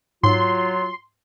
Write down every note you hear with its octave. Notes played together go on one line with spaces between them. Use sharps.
G#2 F#3 F4 C6